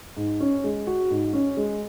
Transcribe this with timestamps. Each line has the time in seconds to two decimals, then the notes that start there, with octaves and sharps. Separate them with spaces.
0.17 G#2
0.40 C#4
0.64 G#3
0.87 F#4
1.11 G#2
1.33 C#4
1.57 G#3